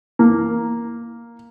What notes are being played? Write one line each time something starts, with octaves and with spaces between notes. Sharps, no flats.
A#3